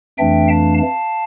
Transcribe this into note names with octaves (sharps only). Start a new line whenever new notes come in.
F2 E3 A3 D4 E5 G5
F5 A5
F5 A5